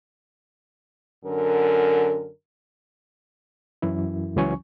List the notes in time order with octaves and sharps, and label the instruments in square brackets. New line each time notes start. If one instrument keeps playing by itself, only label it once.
[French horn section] F#2 D3 A#4
[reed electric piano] F#2 E3 E4
C#2 E3 F#3 C#4 G#5 C#6